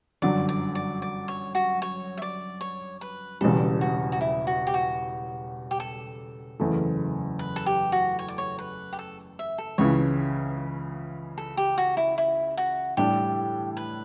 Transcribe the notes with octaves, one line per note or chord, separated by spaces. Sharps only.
G1 F#2 D3 F#3 D5
D5
D5
D5
C#5
F#4
C#5
E5
D5
C#5
B4
E1 E2 C#3 G3 A4
F#4
F#4
E4
F#4
G4
F#4
G4
A4
F#1 E2 C#3 E3 A3
B4
A4
G4
F#4
C#5
D5
C#5
B4
G4
A4
E5
A4
C#2 C#3 E3 C#5
A4
G4
F#4
E4
E4
F#4
A2 G3 D4 G4
B4